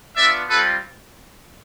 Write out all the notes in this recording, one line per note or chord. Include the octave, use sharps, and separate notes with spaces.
B3 D4 F4 D5 E5
G3 C4 F4 A4 B4